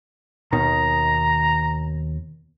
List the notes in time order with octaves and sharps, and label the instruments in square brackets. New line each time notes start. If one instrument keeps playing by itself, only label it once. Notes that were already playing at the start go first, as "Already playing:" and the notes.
[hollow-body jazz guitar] D#2 B2 D#3 [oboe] A#5